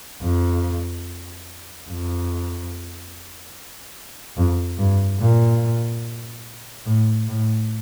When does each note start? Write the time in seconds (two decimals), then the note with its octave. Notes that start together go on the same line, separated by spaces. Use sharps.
0.22 F2
1.89 F2
4.37 F2
4.78 G2
5.20 A#2
6.86 A2
7.28 A2